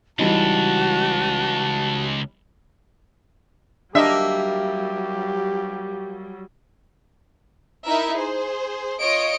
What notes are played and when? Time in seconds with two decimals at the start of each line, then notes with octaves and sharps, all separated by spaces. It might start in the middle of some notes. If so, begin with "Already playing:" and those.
0.19 C#2 E3 G3 D#4 F#4 A5
3.95 F#3 G3 A#3 D4 G4 D#5 E5
7.85 D#4 E4 A#4 E5
8.17 G#4 C5
9.01 F4 C#5 D#5 C#7 D7